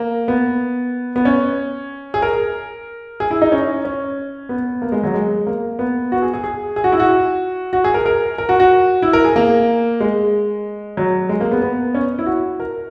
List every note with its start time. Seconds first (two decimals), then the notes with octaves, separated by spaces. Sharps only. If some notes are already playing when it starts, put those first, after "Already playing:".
Already playing: A#3
0.28 B3
1.16 B3
1.25 C#4
2.14 G#4
2.22 A#4
3.20 G#4
3.31 E4
3.42 D#4
3.52 C#4
3.85 C#4
4.49 B3
4.82 A#3
4.92 G#3
5.04 F#3
5.14 G#3
5.47 A#3
5.79 B3
6.12 F#4
6.22 G#4
6.34 G#4
6.44 G#4
6.76 G#4
6.84 F#4
6.92 E4
7.00 F#4
7.73 F#4
7.84 G#4
7.94 A#4
8.06 A#4
8.38 A#4
8.49 F#4
8.60 F#4
9.02 E4
9.13 A#4
9.24 G#4
9.36 A#3
10.00 G#3
10.97 F#3
11.29 G#3
11.40 A#3
11.51 B3
11.62 B3
11.94 C#4
12.19 E4
12.26 F#4
12.60 A#4